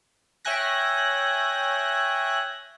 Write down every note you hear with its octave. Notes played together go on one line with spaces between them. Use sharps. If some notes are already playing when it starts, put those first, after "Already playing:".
C#5 E5 G5 G#5 F#6 A#6